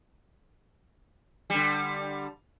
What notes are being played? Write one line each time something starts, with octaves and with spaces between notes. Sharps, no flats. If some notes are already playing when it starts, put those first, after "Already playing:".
D3 G3